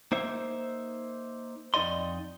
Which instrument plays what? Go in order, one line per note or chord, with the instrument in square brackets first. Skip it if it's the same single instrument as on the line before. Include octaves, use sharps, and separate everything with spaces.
[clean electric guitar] A#3 D#4 C5 E5
F2 D#4 D5 D#5 C6